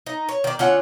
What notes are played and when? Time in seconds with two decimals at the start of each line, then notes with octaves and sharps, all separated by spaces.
0.06 D#4
0.29 C#5
0.44 D#3 D5
0.59 D3 C#4 F4 F#5